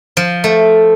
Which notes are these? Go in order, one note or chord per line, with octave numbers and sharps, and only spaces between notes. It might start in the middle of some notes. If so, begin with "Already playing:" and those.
F3
A3